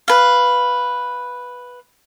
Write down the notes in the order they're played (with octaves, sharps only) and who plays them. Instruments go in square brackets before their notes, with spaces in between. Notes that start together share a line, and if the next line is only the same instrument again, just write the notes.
[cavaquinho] B4 F5